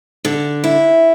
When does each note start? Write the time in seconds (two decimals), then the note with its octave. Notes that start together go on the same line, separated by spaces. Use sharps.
0.25 D3
0.64 E4